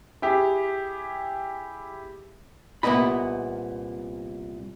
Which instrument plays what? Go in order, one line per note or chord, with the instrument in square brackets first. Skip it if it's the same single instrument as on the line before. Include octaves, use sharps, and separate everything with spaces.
[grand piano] E4 G4 G#4
[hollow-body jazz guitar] C2 A#2 B3 D#5 B5